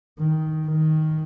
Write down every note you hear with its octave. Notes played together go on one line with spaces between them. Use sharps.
D#3
D#3